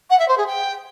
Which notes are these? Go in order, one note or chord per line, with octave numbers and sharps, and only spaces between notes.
F#5
E5
C5
G#4
G5